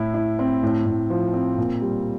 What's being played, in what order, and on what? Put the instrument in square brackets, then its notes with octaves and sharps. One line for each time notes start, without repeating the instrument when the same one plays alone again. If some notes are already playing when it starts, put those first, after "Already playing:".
Already playing: [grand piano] A2 E4
E4
C4
A2
A2
F3
C4
A#2
G3